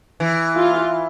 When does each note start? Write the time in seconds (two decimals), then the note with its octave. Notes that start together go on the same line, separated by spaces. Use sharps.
0.20 E3
0.56 F4